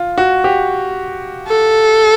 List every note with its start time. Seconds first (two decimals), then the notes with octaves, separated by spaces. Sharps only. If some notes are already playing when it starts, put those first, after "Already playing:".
Already playing: F4
0.18 F#4
0.44 G4
1.48 A4